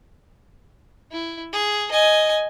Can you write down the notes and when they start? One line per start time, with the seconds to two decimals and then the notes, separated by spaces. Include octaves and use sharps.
1.12 E4
1.53 G#4
1.92 D#5 G#5